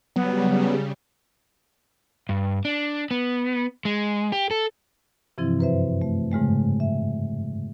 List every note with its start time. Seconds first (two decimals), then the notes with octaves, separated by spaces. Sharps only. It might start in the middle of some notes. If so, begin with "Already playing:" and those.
0.16 C#3 F#3 G3 B3
2.29 G2
2.65 D4
3.11 B3
3.85 G#3
4.32 G4
4.51 A4
5.38 G2 C3 E3 F3 C4 E4
5.59 F#2 B4 C5 E5
6.02 A3
6.31 G#2 C#3 G#3 A3
6.80 E5